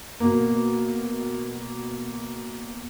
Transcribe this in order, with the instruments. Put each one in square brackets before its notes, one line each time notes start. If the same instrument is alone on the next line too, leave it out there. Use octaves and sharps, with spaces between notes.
[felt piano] B2 A#3